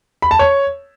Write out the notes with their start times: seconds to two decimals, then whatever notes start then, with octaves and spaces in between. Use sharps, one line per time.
0.22 B5
0.31 A5
0.39 C#5